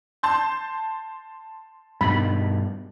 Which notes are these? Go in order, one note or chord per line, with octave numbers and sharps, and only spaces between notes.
A5 C6 G6
G2 B2 D#3 B5